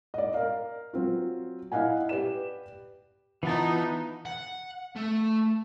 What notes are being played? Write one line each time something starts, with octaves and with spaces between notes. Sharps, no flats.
D5 D#5
A#4 F5
F#3 C4 F4
E4 D#5 F5 F#5 G#5
G4 B4 D5 E7
E3 B3 D#4 F4 A5
F#5
A3